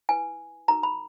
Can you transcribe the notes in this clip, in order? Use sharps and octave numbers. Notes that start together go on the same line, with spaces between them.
E4 B4 G#5
D#4 F#4 A#4 A#5
B5